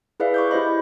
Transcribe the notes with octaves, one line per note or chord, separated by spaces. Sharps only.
E4 G#4 B4 D5 E5 F5
C#6 D6 G6
E4 G4 C5 D#5 B5